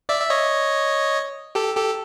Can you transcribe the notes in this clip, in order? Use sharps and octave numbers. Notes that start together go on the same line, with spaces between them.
D5 E5
E5
C#5 D#5
G4 A4
G4 A4